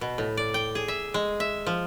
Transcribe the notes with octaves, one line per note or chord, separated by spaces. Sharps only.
B2
A2
D5
G5
G#4
E5
G#3
E5
F3